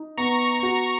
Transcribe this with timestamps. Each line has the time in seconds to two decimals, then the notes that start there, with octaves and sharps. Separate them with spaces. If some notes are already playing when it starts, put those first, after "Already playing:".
Already playing: D#4
0.18 B3 A#5 C#6
0.63 F#4